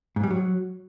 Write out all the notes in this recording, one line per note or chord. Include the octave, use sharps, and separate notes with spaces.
G#2
G3
F#3